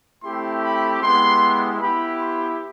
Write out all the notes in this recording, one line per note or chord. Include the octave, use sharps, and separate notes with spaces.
A3 C4 E4 G4 C6
B5
G#3 B3 E4 G4 C6
B3 E4 G4 B5
C6